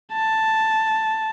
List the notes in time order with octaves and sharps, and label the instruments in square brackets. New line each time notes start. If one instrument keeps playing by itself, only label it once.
[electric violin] A5